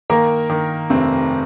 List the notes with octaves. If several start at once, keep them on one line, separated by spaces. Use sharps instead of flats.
D#3 A#3 A#4
D#3
F1 C3 C4